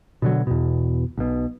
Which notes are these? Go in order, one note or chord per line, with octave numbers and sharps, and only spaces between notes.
B2 D3 F#3
E2 B2
B1 B2